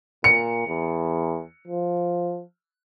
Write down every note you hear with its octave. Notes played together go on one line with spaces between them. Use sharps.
A#2 C#7
E2
F3